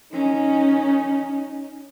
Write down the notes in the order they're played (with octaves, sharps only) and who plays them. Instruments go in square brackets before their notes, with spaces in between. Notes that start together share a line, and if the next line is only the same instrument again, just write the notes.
[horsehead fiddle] C#4 D#4